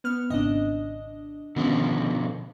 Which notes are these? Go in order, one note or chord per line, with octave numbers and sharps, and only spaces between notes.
B3 F6
G#1 C#3 C4 D4 D#5
B2 D3 D#3 F3 B3 C#4